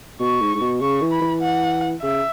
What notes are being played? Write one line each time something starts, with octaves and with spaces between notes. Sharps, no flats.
B2 C#6
G#2
G#2
B2
C#3 C#6
E3
B5
E3
F#5
C#3 E5